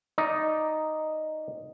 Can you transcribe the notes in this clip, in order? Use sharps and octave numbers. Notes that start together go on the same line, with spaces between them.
D#4 D5